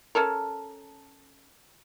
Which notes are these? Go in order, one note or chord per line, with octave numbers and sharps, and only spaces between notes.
C#4 A4 A#4